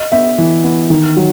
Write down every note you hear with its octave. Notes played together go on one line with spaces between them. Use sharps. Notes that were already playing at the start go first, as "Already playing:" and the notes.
Already playing: D#5
B3 E5
E3
B3
D#3
F#3